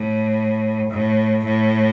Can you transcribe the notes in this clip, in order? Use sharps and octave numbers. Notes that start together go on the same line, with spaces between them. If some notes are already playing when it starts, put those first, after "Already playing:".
Already playing: A2
A2
A2